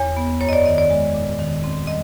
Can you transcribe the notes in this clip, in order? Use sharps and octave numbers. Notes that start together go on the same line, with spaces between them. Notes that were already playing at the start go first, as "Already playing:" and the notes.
Already playing: E2 C#5
B3
F#2 C#5
D#5
D5
D#3 D#5
D5
G#3
A#2
D#3
C4
G3 D#5